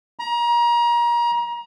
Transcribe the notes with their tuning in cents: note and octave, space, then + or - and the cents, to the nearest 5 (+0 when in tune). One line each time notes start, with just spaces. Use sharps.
A#5 +30